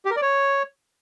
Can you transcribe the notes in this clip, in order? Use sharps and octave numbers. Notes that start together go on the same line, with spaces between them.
G4
A#4
D5
C#5